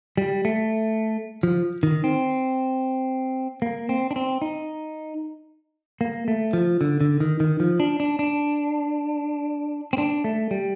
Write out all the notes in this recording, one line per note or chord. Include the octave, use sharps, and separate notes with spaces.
G3
A3
F3
D#3
C4
A#3
C4
D4
C4
D#4
A#3
A3
F3
D3
D3
D#3
D#3
F3
D4
D4
D4
C4
D4
A3
G3